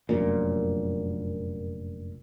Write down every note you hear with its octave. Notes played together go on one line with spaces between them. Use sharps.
F1 A#1 F#2 A#2